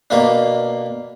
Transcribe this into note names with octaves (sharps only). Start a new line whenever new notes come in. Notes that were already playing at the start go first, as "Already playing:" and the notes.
B2 A#3 D4